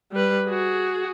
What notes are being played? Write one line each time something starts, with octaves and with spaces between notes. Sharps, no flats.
G3 B4
F#4 G#4